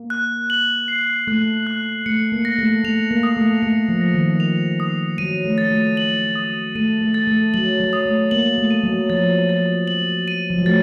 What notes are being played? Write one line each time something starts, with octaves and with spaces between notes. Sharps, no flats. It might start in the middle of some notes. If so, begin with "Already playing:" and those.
Already playing: A#3
F#6
F#7
C7
A3 F#6
F#6
A3 C#7
A#3
A#6
A3
A3 F7
A#3
D#6
A3
A3 C#7
F3
A#6
D#3
F7
D#6
F#3 D#7
A3
A6
A3
F#7
D#6
A3 D#7
A3
A6
A3
F#3 F#7
F#3
D#6
A3
A#3 F#7
A3
D#7
F#3
F3 A6
A6
F#7
D#7
F3
F#3
A3 A6